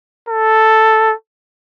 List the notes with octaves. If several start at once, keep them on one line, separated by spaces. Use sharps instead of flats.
A4